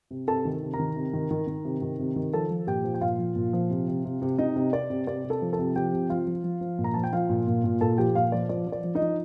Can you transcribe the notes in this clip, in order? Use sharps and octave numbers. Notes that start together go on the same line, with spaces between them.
C3
C3 A4 A5
D#3
C3
A#4 A#5
D#3
C3
D#3
D#3
D#3
C3
D#3
C3
D#3
F3 A4 A5
F3
A#2 G4 G5
F3
G5
A#2 F4 F5
F3
A#2
F3
C3
C3
C3
C3
C3 D#4 D#5
C3
C3 D5
C3
C3 D5
C3
A4 A5
F3
A4 A5
C3
F3 G4 G5
C3
F3 F4 F5
F3
F3
F3
A#2
A#5
F3 A5
G5
F3 F4 F5
A#2
A#2
A#2
A#2 A4 A5
F3 G4 G5
A#2 F4 F5
F3 D5
F3 D5
F3
D5
F3
D#4 D#5
F3